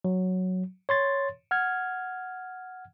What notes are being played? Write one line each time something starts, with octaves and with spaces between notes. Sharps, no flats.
F#3
C#5 C6 A6
F#5 F6 G#6